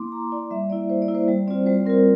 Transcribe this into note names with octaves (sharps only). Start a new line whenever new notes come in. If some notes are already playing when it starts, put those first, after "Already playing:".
Already playing: A#3 E4 C6 D6
A#3 A#5
E4 D5
G3 E5
A#3 E4 D5
G3 C5
D5
A#3 E4
C5
G3 C5
C4 F4 D5
G3 C5
C4 F4 A#4